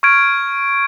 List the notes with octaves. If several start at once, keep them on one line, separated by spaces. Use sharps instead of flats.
C#6 F6 G#6 D7